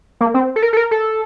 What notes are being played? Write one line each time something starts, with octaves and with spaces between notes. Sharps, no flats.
A#3
C4
A4
A#4
A4
A#4
A4